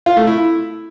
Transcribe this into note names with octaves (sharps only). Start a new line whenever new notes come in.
F4
A3
E4